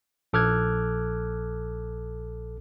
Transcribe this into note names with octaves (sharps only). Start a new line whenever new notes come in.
A#1 A4 D6 F6 F#6 G#6